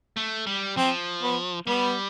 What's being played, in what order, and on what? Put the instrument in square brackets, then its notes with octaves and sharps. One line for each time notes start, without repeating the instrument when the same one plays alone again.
[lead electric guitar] A3
G3
[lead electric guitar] F3 [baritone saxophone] C4
[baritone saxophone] B3
[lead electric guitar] G3 [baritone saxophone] B3